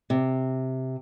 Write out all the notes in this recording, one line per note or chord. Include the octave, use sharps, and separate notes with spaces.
C3